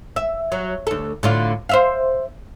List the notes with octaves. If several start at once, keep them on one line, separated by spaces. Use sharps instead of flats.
E5
F#3
D2 A4
A2 D3 F4
C5 E5 F5